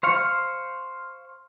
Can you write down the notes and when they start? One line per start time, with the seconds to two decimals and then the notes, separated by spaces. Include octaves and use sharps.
0.03 C5 F5 C#6